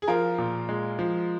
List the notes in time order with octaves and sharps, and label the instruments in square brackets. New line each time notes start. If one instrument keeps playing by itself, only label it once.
[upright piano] G#4
[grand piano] F3 [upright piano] F4 A#4
[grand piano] A#2
G#3
F3